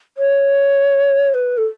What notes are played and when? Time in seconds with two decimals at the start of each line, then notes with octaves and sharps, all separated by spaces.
0.17 C#5
1.34 B4
1.57 A4